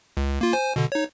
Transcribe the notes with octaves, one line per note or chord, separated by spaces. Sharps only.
C#2
A#3 F4
C5 G#5
B2 D3
D#4 C#5